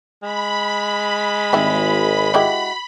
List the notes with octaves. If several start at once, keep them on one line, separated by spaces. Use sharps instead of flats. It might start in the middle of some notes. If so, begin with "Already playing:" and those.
G#3 B5
G#1 G3 E4
G#3 E4 F#4 G4